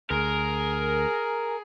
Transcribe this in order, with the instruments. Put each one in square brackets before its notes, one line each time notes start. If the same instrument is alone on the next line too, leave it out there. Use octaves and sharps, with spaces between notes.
[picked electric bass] D2 [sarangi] G#4 [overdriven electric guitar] A#4